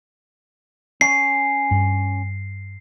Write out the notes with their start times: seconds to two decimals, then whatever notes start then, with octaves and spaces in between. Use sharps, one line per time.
1.01 C#4 C7
1.71 G2